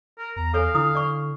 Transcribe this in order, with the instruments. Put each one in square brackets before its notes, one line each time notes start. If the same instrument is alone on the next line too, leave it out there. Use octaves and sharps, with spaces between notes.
[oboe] A#4
[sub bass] E2 [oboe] A#5
[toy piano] A4 C#5 G#5 [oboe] F5
[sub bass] D3 [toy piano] D4 E4 D#6
[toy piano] D5 C#6